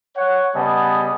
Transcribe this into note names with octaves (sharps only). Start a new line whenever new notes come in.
C#5 F#5
C#3 G3 B3 D#5 G#5 A5